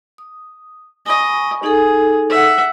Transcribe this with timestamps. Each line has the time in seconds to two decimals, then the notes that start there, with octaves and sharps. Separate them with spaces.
0.18 D#6
1.06 D#5 G#5 B5 C#6
1.63 D#4 G#4 A4
2.30 E5 F#5